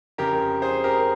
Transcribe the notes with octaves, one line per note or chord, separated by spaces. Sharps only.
F2 C#3 G4 A#4
G#4 C5
G4 A#4